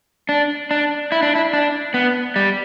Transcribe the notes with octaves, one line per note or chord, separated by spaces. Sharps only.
D4
D4
E4
D4
E4
D4
B3
G3